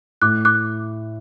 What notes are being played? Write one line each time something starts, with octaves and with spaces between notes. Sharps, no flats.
A2 D6 F#6
D6 F#6